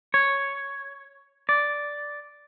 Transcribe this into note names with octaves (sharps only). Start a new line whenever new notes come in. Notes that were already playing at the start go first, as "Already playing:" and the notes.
C#5
D5